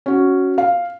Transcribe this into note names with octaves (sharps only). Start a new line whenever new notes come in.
C#4 F#4
F5